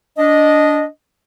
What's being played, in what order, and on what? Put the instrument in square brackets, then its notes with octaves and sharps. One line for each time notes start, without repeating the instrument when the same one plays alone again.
[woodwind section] D4 D#5